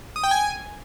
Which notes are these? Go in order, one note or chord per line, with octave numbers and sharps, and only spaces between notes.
D#6
G5
G#5